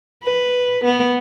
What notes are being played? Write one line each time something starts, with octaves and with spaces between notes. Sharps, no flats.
B4
B3